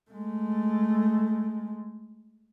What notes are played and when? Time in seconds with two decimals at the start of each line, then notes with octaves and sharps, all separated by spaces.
0.11 G#3 A3